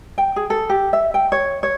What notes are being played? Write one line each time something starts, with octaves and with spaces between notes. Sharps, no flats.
G5
G#4
A4
G4
E5
G5
C#5
C#5